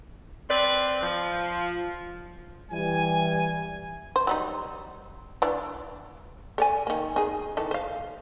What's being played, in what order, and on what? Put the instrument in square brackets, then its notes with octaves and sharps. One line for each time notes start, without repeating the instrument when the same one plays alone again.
[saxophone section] C4 B4 D5
F3
[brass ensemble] E3 G3 [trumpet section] G#5
[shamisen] C5
F#3 G3 D#4
E3 D4
A4 D5 G#5
D#3 A#3
D#4 G#4
D#3 E3 A4
C5 F5